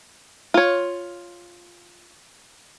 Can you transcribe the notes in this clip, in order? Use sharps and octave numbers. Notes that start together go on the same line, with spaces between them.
F4 C#5